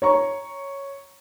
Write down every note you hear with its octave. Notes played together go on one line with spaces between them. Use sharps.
C#5 A#5 C#6